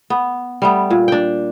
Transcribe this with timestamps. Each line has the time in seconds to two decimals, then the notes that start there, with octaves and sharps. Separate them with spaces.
0.10 B3
0.62 G3 A3 B3
0.90 A#2
1.08 D4 G5